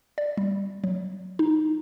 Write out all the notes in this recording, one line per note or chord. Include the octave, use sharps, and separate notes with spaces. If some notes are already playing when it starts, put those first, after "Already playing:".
D5
G3
F#3
D#4